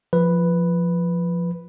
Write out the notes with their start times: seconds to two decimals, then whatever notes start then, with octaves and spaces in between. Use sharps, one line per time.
0.13 F3 B4